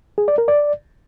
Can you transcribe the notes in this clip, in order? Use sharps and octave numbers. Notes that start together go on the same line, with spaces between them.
G#4
D5
A#4
D5